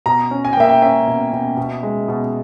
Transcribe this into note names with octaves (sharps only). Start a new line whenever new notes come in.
B2 A#5
C#4
G#5
G5
A#3 E5
G5
C#4 E5
B2
B2
B2
G#3
B2